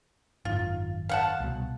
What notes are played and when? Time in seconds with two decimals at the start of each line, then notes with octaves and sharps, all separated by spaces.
0.45 G#1 F#2 D#3 F4
1.09 F5 F#5 A5
1.40 C2 B2